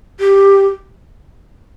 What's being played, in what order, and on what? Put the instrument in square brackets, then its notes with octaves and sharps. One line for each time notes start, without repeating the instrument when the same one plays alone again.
[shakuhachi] G4